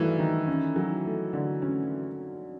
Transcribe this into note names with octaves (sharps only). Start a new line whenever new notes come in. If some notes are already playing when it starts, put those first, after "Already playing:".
Already playing: G2 D#3 E3 F#3 A3
D#3
C#4
F#3
A3
D3
C#4